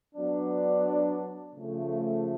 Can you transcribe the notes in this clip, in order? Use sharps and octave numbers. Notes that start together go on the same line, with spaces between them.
F#3 B3 D4
C#3 F3 A3